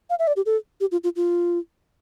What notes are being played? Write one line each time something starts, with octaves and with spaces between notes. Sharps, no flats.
F5
E5
D5
G4
A4
G4
F4
F4
F4